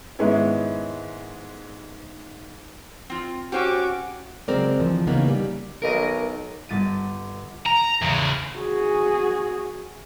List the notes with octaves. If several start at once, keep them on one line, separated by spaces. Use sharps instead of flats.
G#2 D#3 G#3 B3 C#4 E4
C4 F4
C#4 F#4 G4 C5 G5 D6
C#3 F#3 G#3 C4 A#4 D5
D2 E3 F3
C#3 E3 A#3 B3 C#4 D#4
G3
B1 A#4 D#5
G1 A6 D#7
A#5
E2 C#3
F#4 G#4